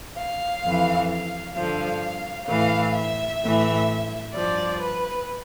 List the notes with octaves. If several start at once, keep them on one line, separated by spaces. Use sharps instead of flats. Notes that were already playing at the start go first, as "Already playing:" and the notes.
F5
F2 E3
F5
G2 D3 F3 F5
A2 E3 F5
E5
A2 E3
G2 F3 D5
B4